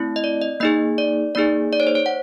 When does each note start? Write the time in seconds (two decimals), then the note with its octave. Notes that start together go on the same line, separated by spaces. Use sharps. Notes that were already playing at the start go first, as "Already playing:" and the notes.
Already playing: A3 C4 E4
0.16 D#5
0.24 D5
0.42 D#5
0.60 A#3 D#4 G#4 D#5
0.98 D5
1.35 A#3 D#4 G#4 D5
1.73 D5
1.80 C#5
1.87 C5
1.95 C#5
2.06 F#5